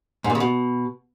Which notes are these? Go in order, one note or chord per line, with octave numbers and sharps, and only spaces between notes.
G#2
A#2
C#3
B2